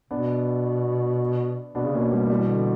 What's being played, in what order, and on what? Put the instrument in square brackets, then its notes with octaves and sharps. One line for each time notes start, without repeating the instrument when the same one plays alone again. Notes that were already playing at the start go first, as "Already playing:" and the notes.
[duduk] B2 [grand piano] B3 D4
[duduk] B2 [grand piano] B3 D4
[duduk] C#3
[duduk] B2 [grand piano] A#3 C#4
[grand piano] G3 B3
A#3
E3 G3
D3